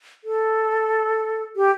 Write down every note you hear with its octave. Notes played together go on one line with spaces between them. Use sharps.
A4
G4